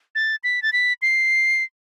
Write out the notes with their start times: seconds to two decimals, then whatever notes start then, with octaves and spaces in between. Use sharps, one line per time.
0.15 A6
0.44 B6
0.62 A6
0.73 B6
1.02 C7